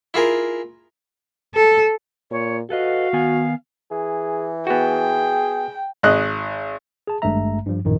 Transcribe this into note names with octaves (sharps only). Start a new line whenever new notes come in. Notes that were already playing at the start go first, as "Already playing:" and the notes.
E4 F4 G#4 A#4
A4
A#2 C#5
F#4 A4 B4 D#5 F5
D#3 B3 G#5
E3 G#4
B3 F#4 G#4 G5
G#1 D#5 F#6
G#4 A5
G#1 G2 G#3 A3 E5 A#5
G2 F3
A#1 F#2 A2 D#3